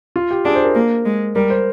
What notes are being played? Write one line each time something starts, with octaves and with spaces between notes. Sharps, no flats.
F4
G4
D4 G#4
C5
A#4
A#3
G#3
G3 A#4
C5